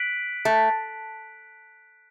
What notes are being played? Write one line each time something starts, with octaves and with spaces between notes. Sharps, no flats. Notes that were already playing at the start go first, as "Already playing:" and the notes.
Already playing: F#6 B6 D7 F#7
A3